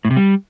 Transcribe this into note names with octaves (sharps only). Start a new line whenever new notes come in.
A2
C3
G3